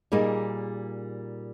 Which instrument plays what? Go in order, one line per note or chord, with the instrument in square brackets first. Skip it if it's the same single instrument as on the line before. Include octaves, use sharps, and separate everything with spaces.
[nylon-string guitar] A#2 G3 A#3 D#4 G#4